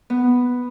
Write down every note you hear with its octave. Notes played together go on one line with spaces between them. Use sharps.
B3